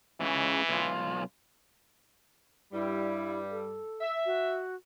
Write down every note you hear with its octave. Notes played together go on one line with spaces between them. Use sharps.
C#2 C#3 E3
B1 F4
G2 G3 E4
A4
E5
F#4